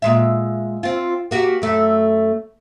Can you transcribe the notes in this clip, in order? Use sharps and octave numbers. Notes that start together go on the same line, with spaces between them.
A#2 G#3 E5
C4 F4
A#3 F#4 G4
F#2 A3